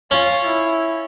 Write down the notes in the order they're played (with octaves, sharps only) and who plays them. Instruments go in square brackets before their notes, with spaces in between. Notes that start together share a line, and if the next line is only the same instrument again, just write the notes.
[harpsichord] C#4 [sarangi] F4
[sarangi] E4